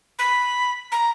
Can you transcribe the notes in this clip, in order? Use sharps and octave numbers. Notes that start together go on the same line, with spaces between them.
B5
A#5